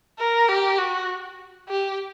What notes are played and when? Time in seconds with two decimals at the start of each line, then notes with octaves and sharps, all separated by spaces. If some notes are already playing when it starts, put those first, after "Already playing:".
0.19 A#4
0.49 G4
0.79 F#4
1.69 G4